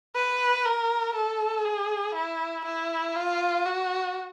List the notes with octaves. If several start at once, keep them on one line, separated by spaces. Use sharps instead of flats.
B4
A#4
A4
G#4
E4
E4
F4
F#4